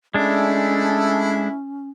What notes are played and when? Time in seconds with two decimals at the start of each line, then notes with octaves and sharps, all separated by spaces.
0.14 G#3 A3 C#4 D4 E4